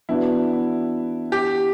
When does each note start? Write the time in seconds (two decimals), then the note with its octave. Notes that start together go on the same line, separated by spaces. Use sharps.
0.09 E3 B3 D4 E4 F#4
1.32 G4